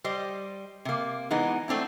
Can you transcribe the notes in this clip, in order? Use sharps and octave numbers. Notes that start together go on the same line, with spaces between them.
G3 C5 D#5
C3 A#3
E3 G#3 B3 D#4
A3 C4 D4 E4